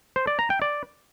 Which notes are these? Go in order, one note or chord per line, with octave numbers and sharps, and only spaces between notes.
C5
D5
A#5
G5
D5